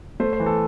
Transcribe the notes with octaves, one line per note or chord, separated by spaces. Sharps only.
A3 C5
C5
E3
A4